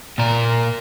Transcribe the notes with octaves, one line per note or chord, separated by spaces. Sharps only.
A#2 A#4